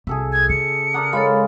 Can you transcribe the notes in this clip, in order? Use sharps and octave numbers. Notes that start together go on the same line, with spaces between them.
C2 G#4 A4 E5
G#6
C#3 C#7
A#4 D5 F#5 A5 A#5 D#6
G#3 F4 A4 A#4 C#5 B5